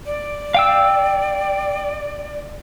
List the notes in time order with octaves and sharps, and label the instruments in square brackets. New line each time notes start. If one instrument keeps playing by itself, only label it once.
[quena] D5
[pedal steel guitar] F5 G5 E6